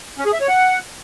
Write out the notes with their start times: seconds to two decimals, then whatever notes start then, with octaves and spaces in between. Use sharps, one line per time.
0.18 C#4
0.25 G#4
0.33 E5
0.41 C#5
0.48 F#5